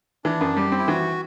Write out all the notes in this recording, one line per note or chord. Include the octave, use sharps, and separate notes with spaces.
E3 D4
F#2
G3 G4
C4
E4
E3 F#4